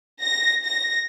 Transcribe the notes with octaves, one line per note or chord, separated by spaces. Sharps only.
A#6
A#6